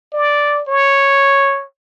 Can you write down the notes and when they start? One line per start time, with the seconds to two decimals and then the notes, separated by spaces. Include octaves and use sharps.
0.13 D5
0.68 C#5